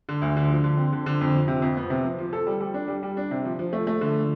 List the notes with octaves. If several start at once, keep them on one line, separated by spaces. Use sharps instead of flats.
D3
D2
D3
F3
D3
C4
D3
D3
F2
F3
C3
F2
B3
C3
F3
F3
A4
G3
G3
D4
G3
G3
D4
C3
F3
F3
A3
A3
D3